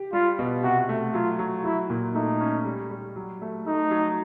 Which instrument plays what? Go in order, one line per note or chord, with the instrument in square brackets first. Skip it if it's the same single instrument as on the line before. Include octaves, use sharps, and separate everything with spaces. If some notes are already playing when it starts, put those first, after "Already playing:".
Already playing: [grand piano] G4
[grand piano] G3 [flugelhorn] F4
[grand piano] B2
[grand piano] C3 [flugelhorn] F#4
[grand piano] A3
[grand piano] F#3 [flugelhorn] F4
[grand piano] F#3
[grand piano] F#3 [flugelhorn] E4
[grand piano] A#2
[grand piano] A3 [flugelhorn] D#4
[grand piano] C#4
G3
G3
F#3
A3
[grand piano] A3 [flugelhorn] D#4
[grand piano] F#3